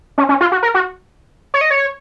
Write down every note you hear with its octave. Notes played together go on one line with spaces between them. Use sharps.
C#4
C#4
F4
F#4
A#4
F#4
C#5
D#5
C#5